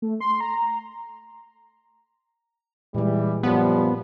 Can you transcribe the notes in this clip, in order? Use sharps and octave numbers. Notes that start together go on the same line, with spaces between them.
A3
C6
A#5
A#2 E3 G3 G#3
F#2 F3 G3 B3